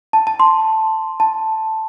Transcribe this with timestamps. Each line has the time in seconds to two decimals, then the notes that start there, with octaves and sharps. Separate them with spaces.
0.13 A5
0.27 A5
0.40 C6
1.20 A5